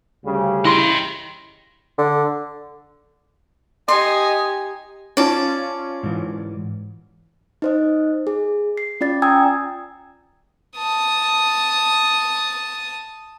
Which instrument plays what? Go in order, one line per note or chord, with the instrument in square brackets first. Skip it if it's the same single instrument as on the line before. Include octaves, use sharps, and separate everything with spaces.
[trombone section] D2 C#3 G3
[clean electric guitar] E4 C6 [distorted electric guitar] D#5 G5
[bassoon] D3
[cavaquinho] D#4 C6 [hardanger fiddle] G4 G#5 [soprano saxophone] D#5
[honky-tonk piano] C#4 F4 [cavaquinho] D5 A5
[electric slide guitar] G#2 E3
[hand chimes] D#4 C5 D#5
G#4
C7
C#4 F4 D5 A6
G5 G#5 A#5 D#6 E6 G#6
[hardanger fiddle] A5 D#6